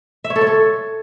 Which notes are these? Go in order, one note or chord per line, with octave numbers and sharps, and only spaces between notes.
E5
C#5
A4
C#5
A4